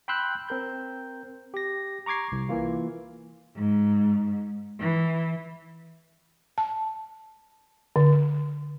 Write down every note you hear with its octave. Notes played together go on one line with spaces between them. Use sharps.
G5 B5 C6 E6 F#6 G6
C4 A#4 G6
G4 A#6
A#5 C#6 D6 G#6 C7
C2
E3 A#3 F4
G#2
E3
A5
D3